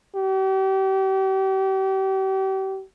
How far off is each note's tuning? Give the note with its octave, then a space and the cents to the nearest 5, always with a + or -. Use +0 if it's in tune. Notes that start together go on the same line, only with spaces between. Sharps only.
G4 -35